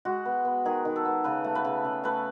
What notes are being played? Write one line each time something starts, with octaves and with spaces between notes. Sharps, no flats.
G#3 F#4
B3
B3
D#3 G#4
D#3
A4
B3
C#3 B4
A3
B4
C#3
C#3
A3 B4